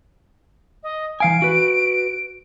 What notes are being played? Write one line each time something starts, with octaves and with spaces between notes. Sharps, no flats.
D#5
E3 F5 G#5 D7
F#4 B4